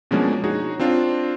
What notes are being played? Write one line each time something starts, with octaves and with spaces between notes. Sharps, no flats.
B2 F3 G#3 A#3 C#4 D4
D#4 F#4 G#4 C#5
C4 D4 F4